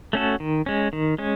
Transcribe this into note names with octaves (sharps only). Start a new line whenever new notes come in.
A3 C#4 F#4 A4
D#3
G#3 C#4
D#3
G#3 C#4